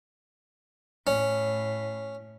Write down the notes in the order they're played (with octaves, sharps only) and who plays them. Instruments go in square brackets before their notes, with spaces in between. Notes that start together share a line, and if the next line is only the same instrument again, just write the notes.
[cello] A2 [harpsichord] C#4